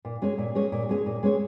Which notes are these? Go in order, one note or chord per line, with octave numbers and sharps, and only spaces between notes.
A#2
G#3 C#4 G#4 C#5
A#2
G#3 C#4 G#4 C#5
A#2
G#3 C#4 G#4 C#5
A#2
G#3 C#4 G#4 C#5